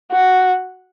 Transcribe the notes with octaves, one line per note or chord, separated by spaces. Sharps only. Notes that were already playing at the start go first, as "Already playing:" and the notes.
F#4